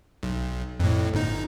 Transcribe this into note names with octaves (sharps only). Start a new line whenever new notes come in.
B1
F2 A2
G1 D#4